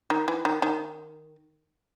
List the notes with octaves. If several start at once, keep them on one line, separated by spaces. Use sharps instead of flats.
D#3
E3
D#3
D#3